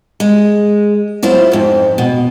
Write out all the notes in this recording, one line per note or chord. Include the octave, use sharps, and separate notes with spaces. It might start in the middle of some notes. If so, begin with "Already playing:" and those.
G#3
F#3 E4 F4 C5
F2 G#2
B2